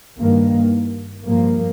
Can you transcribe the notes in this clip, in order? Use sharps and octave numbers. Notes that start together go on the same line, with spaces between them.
G2 D#3 A#3
G2 F3 A#3